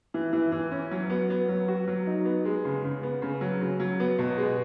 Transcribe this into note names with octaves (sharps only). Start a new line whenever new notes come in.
E3
E3
E3
C#4
F#3
B3
B3
F#3
F#4
F#3
D#4
B3
G#3
C#3
C#3
B3
C#3
F#3
C#3
F#3
B3
B2
G#3